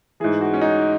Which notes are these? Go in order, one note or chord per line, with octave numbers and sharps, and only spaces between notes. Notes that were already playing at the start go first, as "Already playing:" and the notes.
G#2 E3 G#4
F#4
C#4
D#4